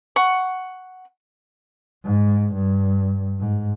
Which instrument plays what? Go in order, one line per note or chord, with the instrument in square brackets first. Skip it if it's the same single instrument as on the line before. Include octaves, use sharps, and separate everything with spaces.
[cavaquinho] F#5 C#6
[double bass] G#2
G2
G#2